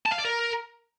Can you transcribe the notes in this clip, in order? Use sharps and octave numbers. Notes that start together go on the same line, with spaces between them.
A5
F5
D5
A#4